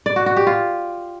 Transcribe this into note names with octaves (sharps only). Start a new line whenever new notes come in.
D5
F#4
F#4
G4
F4